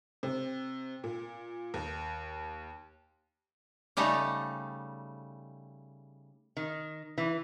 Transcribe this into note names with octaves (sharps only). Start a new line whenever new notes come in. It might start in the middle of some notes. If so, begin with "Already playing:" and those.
C3
A#2
D#2
C#3 G3 A3 D#4
D#3
E3